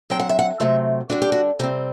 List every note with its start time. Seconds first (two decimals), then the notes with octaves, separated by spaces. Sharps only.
0.10 D3 F#3 C4 G5
0.19 F#5
0.29 E5
0.39 F#5
0.60 C3 F#3 A3 C4 E5
1.10 D3 G3 D4 F#4
1.22 G4
1.32 F#4
1.59 C3 G3 C4 G4